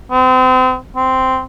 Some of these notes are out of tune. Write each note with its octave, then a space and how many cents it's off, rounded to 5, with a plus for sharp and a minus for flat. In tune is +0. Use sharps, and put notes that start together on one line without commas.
C4 -35
C4 -5